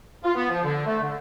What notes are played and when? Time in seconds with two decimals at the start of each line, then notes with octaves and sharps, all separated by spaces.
0.23 F4
0.35 B3
0.49 F3
0.63 D3
0.86 A3
1.01 D3